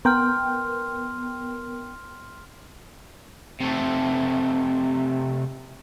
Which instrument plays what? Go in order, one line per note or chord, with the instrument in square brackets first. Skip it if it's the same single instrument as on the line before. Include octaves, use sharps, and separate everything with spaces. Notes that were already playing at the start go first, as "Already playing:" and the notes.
[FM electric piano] B3 A#4 G5 [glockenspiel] C6 F6
[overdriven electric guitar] C3 A3